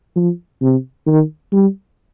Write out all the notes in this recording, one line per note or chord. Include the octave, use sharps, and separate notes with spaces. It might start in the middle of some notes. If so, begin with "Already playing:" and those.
F3
C3
D#3
G3